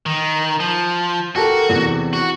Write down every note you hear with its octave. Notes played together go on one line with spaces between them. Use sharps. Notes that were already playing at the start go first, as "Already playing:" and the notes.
D#3
F3
F#4 G4 A4 A#4
E2 C3
F#4